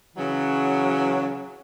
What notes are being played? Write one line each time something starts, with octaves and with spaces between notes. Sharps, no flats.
C#3 E3 F#3